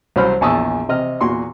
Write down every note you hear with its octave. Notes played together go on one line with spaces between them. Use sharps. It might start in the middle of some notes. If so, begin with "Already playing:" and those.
C2 F#3 C#4 C5 B5 F6
A#1 E2 A5 C#6 D#6 E6
C3 D#5 F6
E2 A#2 F#4 C6 C#6